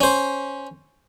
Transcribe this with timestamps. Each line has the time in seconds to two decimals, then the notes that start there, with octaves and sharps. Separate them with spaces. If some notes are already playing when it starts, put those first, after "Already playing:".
0.01 C#4 C5